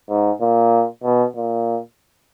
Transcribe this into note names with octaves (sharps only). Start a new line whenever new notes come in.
G#2
A#2
B2
A#2